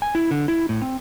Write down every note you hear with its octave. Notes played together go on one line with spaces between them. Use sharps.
G#5
E4
D3
E4
A2
C4